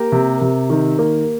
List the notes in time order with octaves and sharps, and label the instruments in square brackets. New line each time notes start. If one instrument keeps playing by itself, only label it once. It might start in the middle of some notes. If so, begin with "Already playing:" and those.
Already playing: [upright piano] A#3 [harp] G4 A#4
[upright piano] C3
C3
D#3
A#3